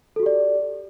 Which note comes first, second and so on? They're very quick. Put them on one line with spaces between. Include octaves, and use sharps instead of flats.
A4 F#4 G4 D5